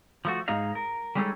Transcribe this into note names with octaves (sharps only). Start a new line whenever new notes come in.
F3 A3 F#4
G#2 G#3 D#4 G#4 D#5 F5
A#4
G3 G#3 C#4 D#4 G#4 A4